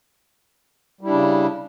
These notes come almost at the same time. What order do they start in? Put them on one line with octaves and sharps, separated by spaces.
G3 E4 D4 C#3